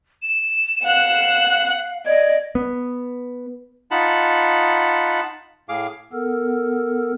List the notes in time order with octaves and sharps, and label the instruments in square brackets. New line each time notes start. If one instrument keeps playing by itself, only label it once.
[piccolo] E7
[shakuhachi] F5 [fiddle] F#5 F#6
[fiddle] D5 [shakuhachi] D#5 [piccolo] G#6
[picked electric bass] B3
[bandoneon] D#4 F4 F#5 A5 B5
A2 G#4 F5 D6
[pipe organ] B3 A4 A#4